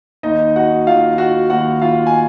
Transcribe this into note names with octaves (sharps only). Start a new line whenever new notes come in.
D#2 D#3 D#4 D#5
F#4 F#5
D#2 D#3 F4 F5
F#4 F#5
D#2 D#3 F#4 F#5
F4 F5
G#5